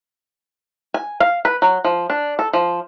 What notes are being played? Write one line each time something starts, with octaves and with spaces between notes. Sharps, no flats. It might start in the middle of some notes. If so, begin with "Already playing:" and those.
G#5
F5
B4
F#3
F3
D4
A4
F3